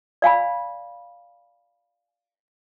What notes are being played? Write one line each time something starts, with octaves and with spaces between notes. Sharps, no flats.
D5 F5 G#5 B5